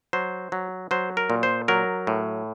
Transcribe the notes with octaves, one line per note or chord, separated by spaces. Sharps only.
F#3 C5
F#3
F#3 C5
A#4
A#2
C5
F#3 A#4
A2